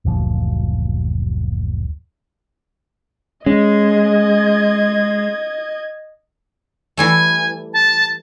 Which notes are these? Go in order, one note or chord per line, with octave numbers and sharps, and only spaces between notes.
F#1 D2 A#2 F3
G#3 C#4 D#5 G#6
E3 G3 A3 G#5
A5